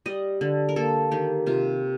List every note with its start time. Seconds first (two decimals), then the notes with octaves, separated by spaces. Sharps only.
0.06 G3 D#5
0.41 D3
0.69 A#4
0.76 A#3 A4
1.11 D#3 G4
1.47 C3 F4